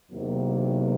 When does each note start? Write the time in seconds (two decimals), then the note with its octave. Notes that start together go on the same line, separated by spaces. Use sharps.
0.11 E2 C3 D#3 F#3 A#3